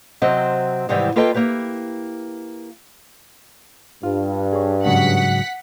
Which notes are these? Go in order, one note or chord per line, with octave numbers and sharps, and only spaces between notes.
C3 F#3 C4 D#5
G#2 C3 D#3 E3 G3
A#3 F4 A4 B4 D#5 G5
A#3 E4 G4 B4
G2 F4
G#4 C#5
G#2 C#3 F#3 F#5 B6